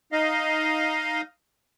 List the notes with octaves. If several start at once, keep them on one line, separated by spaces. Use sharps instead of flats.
D#4 D#5 F5